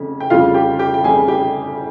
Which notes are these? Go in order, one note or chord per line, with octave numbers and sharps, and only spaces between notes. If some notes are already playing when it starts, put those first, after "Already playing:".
Already playing: F1 F2 C#3
G5
F1 F2 C#3 G3 F4 F5
G4 G5
G4 G5
G5
F1 F2 C#3 G3 G#4 G#5
G4 G5